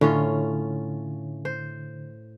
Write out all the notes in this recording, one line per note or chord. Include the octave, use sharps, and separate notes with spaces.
A2 D3 C#4 F4
C5